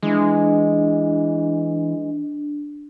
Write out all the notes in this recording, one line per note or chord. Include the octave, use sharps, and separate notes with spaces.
E3 G#3 D4